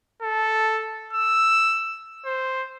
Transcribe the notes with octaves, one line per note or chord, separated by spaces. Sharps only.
A4
E6
C5